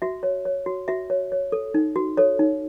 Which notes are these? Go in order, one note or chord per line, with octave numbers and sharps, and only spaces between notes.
F#4 E5
C#5
C#5
F#4
F#4 E5
C#5
C#5
A4
D#4
F#4
A4 C#5
D#4